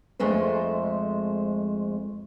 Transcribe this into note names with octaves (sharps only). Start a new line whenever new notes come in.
F2 G#3 A3 C5